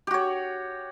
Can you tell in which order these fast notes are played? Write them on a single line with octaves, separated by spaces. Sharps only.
G4 F#4 C#5